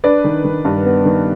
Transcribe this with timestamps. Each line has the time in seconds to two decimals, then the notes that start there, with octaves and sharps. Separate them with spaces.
0.04 D4 B4 D5
0.24 D#3
0.44 D#3
0.65 G2
0.85 B3
1.05 D#3